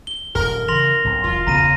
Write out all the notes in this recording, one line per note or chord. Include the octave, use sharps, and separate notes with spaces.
G7
D#1 F#2 A#4
C#3 E3 C6 A#6 F7
B1 G#2 C3
E1 F4
E1 C#3 B3 A#5 A#6 D#7